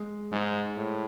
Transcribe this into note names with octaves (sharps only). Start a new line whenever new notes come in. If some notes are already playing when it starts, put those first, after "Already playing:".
Already playing: G#3
G#2 G#3
A2